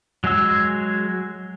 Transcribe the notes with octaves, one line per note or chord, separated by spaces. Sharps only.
F#3 G#3 G#4 E6